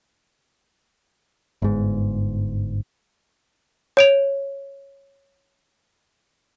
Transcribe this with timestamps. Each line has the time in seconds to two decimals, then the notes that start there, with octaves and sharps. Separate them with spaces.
1.62 G1 G#2
3.97 C#5 D7 F7